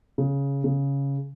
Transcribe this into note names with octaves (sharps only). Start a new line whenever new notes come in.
C#3
C#3